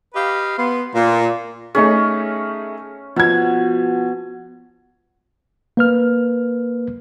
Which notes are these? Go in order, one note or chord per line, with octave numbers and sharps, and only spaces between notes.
G4 B4 D#5 F5
B3 C6
A#2
A3 C#4 D#4 G#4
B2 F3 G#6
A#3 B4 F6